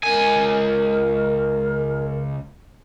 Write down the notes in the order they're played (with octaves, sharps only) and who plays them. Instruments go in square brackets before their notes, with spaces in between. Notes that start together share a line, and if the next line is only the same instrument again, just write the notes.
[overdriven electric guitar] C#2 G#5 [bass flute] A#4